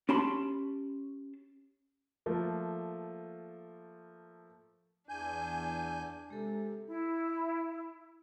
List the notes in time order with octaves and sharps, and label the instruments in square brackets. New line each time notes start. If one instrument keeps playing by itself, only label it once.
[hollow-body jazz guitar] C#4 G4 A5 B5 C6
[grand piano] F3 A3 A#3
[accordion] E2 G#5 G6 [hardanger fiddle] D4
[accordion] C3 [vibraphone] G#3 A4
[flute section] E4